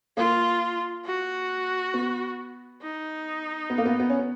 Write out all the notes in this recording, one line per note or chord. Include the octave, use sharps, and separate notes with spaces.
A#3 F4
F#4
B3
D#4
B3
A#3
B3
B3
C#4
B3